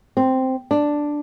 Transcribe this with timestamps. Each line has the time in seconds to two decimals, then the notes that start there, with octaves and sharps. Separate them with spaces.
0.17 C4
0.71 D4